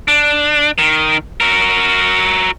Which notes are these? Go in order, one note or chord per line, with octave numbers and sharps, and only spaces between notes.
D4
D#3
F#4 A#4